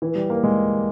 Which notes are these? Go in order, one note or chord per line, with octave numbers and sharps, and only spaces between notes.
E3
G3
A#3
G#3